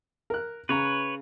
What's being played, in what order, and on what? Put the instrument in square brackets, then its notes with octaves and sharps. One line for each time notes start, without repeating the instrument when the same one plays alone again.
[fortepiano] A#4 F#6
[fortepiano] C#3 A#5 [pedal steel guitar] B4 C#5